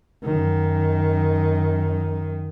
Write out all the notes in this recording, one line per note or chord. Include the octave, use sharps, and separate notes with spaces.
F#2 D#3